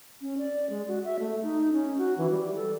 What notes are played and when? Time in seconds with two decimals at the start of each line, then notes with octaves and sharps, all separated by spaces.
0.21 C#4
0.38 D5
0.70 G#3
0.88 F#4
1.05 E5
1.19 A3
1.42 D#4
1.73 C#4
1.98 F#4
2.18 E3
2.31 G3
2.55 A4